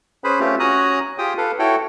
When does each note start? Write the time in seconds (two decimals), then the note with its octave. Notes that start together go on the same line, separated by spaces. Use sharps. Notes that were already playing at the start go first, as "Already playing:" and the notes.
0.24 C#4 G#4 B4 C5 B5
0.40 A3 C4 C#4 F4 G4
0.60 C#4 F#4 G#5 A#5 D#6 F#6
1.18 F4 G4 G#4 G5 D#6
1.38 A4 B4 F5
1.59 E4 F#4 A4 C#5 G5